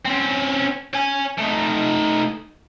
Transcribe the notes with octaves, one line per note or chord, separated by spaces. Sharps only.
C4 C#4
C#5 G#5
A3 D#4